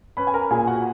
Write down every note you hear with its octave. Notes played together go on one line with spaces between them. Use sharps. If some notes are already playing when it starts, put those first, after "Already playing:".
C#4 B4 B5
G#5
A#4 A#5
A#2 G#4 G#5
F#4 F#5